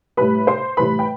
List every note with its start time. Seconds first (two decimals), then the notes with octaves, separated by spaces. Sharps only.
0.17 A2 G3 B4 B5
0.47 C5 C6
0.77 A2 E3 G3 B4 B5
0.99 G5